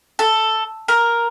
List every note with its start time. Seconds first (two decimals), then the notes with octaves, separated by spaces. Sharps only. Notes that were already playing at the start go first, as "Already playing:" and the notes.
0.19 A4
0.88 A#4